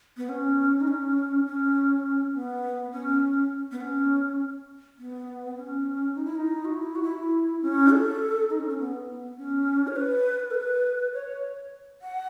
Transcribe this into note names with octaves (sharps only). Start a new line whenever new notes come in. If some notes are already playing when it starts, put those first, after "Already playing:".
B3
C#4
D#4
C#4
C#4
B3
C#4
B3
C#4
B3
C#4
D#4
E4
D#4
F#4
E4
F#4
E4
C#4
A4
D#4
C#4
C#4
B3
C#4
C#5
B4
A4
B4
C#5
F#5